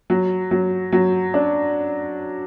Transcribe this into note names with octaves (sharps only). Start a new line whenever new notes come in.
F#3
F#3
F#3
D4